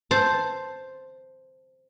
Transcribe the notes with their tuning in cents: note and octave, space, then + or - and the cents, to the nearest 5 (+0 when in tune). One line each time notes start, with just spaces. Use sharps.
C5 +0 A5 +0